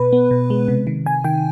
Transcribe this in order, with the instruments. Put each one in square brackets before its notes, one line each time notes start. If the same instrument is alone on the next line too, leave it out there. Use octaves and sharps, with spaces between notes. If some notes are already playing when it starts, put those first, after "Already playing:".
Already playing: [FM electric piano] B2 B4
B3
B2
G#3
C3
D#3
C3 G#5
D#3 G5